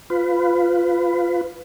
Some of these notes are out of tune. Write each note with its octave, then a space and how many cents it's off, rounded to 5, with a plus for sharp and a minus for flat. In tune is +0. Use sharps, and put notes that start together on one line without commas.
F4 +0 B4 +25